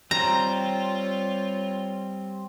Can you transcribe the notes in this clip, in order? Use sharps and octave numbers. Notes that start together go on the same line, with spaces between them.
G3 C4 F4 C#5 A#5